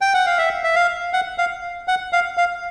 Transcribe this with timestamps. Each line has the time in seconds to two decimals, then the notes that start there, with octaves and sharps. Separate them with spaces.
0.01 G5
0.14 F#5
0.26 F5
0.38 E5
0.64 E5
0.76 F5
1.13 F#5
1.38 F5
1.88 F#5
2.13 F5
2.37 F5